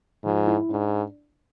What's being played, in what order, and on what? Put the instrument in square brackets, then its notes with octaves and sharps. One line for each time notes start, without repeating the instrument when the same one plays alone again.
[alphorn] G#2 [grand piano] F3
[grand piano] E4
[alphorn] G#2 [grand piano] D4